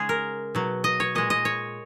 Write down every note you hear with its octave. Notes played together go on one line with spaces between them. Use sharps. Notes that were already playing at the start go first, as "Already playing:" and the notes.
Already playing: C#3 G#3 G#4
A#4
B2 F#3
D#5
C#5
A#2 G#3 D#5
D#5
C#5